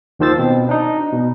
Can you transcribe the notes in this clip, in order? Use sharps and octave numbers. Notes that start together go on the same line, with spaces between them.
D#2 D#3 F3 C5 E6 A6
B2 C4
D4 D#4
B2